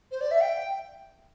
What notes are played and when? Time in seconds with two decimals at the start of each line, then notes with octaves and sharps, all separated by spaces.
0.11 C5
0.21 D5
0.31 E5
0.41 G5